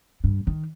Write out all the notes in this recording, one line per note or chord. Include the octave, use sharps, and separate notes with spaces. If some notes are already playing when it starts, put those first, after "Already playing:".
G2
D#3